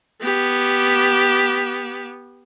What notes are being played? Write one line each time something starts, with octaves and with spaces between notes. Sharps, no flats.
B3 G4